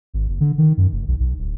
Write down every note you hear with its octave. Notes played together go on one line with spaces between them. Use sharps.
G#1
F#1
D3
D#3
F#2
F1
B1
B1
D1